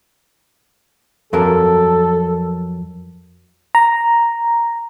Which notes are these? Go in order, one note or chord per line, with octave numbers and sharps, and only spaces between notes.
F2 F#3 A4 A#4
A#5